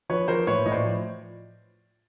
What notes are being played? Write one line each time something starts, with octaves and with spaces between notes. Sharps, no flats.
F3 B4 C#5
F3 A#4 C5
A2 B4 C#5
A2 D#5
C5 D5
F3